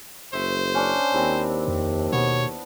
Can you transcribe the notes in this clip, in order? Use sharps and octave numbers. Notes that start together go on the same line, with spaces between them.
F#1 C5 E5 C#6
C#4 D4
D#2 C4 E4
F2
B2 B3 C#5